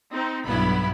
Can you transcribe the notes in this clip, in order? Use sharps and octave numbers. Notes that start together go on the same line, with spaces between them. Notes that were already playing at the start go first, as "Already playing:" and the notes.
C4 D#4
B1 G2 B3 E4 B5